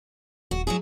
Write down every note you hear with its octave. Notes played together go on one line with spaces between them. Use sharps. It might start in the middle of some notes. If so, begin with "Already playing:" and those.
D#1 F#4
F#3 E4 G#4